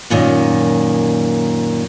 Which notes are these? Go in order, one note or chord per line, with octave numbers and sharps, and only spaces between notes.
F#2 A#2 D#3